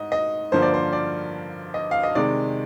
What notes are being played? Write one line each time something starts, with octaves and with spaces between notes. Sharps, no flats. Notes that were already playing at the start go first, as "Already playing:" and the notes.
Already playing: G#2 D#5
D#5
G2 D3 F3 A#3 C5
D5
C5
D5
D#5
F5
D#5
C3 D#3 G#3 D5